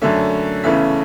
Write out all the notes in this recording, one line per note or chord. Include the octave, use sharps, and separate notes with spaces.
F#2 D3 A3 C#4 E5
E2 C#3 E3 A3 C#4 E5